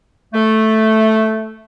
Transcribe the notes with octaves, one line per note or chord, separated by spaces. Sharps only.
A3